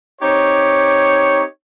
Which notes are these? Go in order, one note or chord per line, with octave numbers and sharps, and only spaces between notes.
C4 D#4 G4 C#5